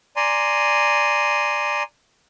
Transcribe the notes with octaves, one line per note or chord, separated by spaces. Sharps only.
D5 G#5 A#5 C6